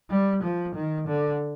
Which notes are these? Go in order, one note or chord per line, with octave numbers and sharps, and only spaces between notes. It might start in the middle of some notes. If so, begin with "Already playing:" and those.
G3
F3
D#3
D3